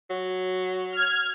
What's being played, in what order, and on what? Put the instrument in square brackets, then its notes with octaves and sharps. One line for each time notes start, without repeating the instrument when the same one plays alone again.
[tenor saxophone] F#3
[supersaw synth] F6 G#6